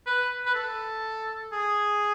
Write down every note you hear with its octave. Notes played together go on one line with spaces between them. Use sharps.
B4
B4
A4
G#4